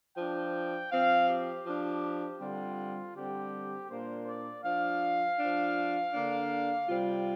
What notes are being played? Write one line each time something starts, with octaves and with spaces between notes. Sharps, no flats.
F3 D4 G5
F3 C4 F5
G4
F3 D4
D3 G3 C4 F4
D3 G3 C4 G4
A#2 A#3 D4 C5
D5
F3 D4 F5
F3 D4
D3 A#3 D4
C3 G3 C4 F4